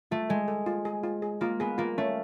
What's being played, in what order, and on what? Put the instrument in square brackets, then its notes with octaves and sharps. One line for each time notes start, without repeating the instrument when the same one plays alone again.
[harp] A3 [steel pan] F4
[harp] G#3 [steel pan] A4
[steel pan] A4
F4
G#4
F4
G#4
[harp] A#3 [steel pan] F4
[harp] B3 [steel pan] G#4
[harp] A#3 [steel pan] F4
[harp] A3 [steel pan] C#4